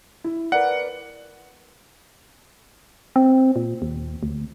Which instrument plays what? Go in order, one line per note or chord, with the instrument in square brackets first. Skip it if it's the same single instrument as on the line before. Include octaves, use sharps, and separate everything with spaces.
[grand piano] E4
[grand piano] A#4 B4 D5 [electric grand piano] F#5
[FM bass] C4
A#2
D#2
D2